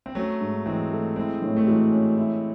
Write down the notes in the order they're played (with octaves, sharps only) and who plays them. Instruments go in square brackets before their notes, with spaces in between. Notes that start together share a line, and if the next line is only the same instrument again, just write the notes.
[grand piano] C4
[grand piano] F#3 A3 [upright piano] C#4
[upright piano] G#2
[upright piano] E3 [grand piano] G#3 C4
[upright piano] A3
[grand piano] G#3 C4 [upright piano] E4
[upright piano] A2
[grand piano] A3
[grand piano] E3 G#3 [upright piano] F#3
[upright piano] C#4
E4